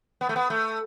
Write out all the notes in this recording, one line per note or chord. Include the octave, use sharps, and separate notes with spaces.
B3
A3
B3
A3